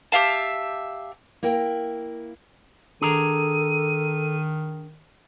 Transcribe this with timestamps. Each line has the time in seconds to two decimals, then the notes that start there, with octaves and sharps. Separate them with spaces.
0.12 G4 E5 F5 A5
1.43 A#3 E4 A#4 G5
3.02 D#3 D4 G#4 A4 A#5 D#7